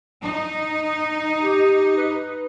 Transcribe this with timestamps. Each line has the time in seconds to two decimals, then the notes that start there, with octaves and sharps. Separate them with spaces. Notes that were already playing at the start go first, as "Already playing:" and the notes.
0.23 D#4
1.40 G4
1.97 B4